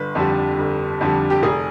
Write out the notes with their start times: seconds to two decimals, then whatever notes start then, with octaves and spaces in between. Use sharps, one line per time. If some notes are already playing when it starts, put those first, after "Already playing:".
Already playing: G1 B4
0.15 F2 D3 G3
0.59 G1
1.01 F2 D3 G3
1.30 G4
1.43 F1 G#4